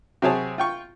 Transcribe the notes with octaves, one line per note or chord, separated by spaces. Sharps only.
C3 F#3 C4 G#4 C#5 A5
F4 G5 C#6